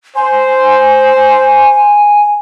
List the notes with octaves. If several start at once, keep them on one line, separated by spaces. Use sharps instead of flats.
C5 G#5